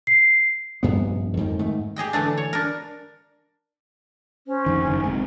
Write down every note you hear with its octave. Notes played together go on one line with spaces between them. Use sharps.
C7
F1 A#1 G2 B3
F2 G#2 D#3
G#2 D#3 A3
G4 G#4 D#5 G5
D3 E3 A3 D4
C#5
D4 A#4
C#4 C5
F2 D#3
F#1 D#3
G#1 G#2 C3